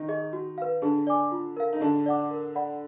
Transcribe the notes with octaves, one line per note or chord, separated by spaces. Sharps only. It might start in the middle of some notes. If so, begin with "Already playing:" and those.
Already playing: D#3 D#4
G#4 D#5
F#4
B4 F5
D3 D4 G#4
D5 G#5 D6
F4
A#4 F5
D#4
D3 D4 G#4
D5 F#5 D6
A#4
D5 F#5 B5